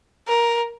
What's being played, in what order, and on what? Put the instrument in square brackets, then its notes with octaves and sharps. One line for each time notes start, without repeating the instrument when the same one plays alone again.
[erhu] A#4